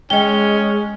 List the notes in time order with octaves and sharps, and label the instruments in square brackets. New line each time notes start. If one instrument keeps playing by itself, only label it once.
[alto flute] G#3 [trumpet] C#4 [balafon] D#5 G5 [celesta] G7